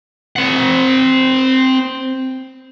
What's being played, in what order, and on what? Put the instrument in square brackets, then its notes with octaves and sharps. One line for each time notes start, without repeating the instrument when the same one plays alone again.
[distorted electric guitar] C4 F#5